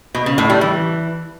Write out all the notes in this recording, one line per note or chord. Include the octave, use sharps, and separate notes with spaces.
B2
C#3
A2
G3
E3